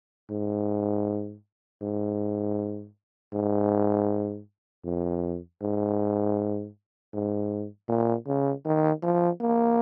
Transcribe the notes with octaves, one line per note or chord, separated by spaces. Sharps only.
G#2
G#2
G#2
F2
G#2
G#2
A#2
C#3
D#3
F3
A#3